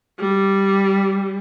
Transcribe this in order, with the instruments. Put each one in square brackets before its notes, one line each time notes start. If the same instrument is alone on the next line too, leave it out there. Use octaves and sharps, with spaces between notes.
[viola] G3